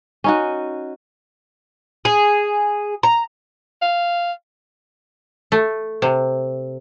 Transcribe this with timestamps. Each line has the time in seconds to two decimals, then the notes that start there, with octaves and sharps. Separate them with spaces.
0.24 C#4 D#4 F#4
2.05 G#4
3.03 A#5
3.82 F5
5.52 A3
6.02 C3